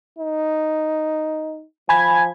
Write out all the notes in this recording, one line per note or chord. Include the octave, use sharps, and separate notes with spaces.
D#4
F3 G#5 B5 G#6